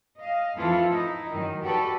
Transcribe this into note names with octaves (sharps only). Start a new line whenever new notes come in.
D#5 F5
F2 E3 E4 F4 A4 F5
D#4 E4
F#2 D#3
F#4 G4 A4 B4 D5